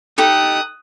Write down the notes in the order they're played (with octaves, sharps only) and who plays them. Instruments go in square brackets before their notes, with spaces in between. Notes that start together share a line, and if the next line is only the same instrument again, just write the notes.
[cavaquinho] D#4 G4 A4 [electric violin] D#6 F#6